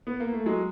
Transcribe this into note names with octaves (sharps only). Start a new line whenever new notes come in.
B3
A#3
A3
F#3 G#3